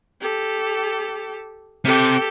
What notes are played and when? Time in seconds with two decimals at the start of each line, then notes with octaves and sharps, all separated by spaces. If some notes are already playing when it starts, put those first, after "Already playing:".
0.22 G4 A4
1.85 C3 G4 A4